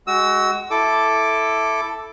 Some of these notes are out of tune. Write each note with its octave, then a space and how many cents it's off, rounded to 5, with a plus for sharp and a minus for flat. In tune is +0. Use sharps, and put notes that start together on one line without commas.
G#3 +0 F#4 +20 E6 -20
E4 +0 A4 +0 D6 +0